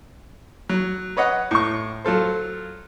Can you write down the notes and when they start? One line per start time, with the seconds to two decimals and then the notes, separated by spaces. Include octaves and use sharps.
0.69 F#3
1.17 B4 C#5 D#5 F#5
1.51 A2 C#6
2.05 F#3 F4 A4 C5